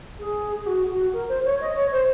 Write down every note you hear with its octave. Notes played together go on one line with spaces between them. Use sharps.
G#4
G#4
F#4
F#4
A#4
C5
C#5
D#5
C#5
C5